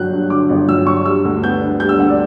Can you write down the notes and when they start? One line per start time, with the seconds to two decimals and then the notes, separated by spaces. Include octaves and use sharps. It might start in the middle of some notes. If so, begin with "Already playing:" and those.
Already playing: G1 D3 F#3 F#6 G6
0.13 G2
0.30 D3 D6
0.50 G1
0.68 F#3 E6
0.86 G2 C#6
1.05 G3 E6
1.25 D2
1.43 B3 G6
1.61 D3
1.80 G3 G6
1.89 E6
1.98 D2 F#5
2.09 D5